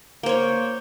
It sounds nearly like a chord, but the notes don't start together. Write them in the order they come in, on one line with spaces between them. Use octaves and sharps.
A#3 C5 C#5